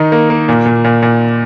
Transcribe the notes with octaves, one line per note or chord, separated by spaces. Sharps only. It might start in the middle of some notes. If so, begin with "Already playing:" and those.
Already playing: D#3 D#4
A#3
A#3
A#2
A#2
A#2
A#2